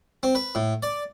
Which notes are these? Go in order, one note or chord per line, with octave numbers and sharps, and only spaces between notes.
C4
B4
A2
D5